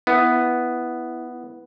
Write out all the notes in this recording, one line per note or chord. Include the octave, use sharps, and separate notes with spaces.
B3 E4